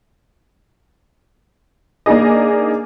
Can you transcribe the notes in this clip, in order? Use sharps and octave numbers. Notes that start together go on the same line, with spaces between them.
A#3 D4 D#4 G#4 D#5